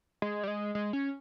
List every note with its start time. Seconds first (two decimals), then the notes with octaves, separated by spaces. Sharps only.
0.22 G#3
0.43 G3
0.48 G#3
0.75 G#3
0.93 C#4